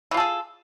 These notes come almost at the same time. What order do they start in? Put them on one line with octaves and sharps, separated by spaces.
E3 F4 A4 G#4